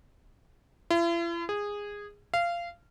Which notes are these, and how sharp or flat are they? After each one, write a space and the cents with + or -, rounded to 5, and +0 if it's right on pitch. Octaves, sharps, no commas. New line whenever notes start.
E4 +45
G#4 -15
F5 -20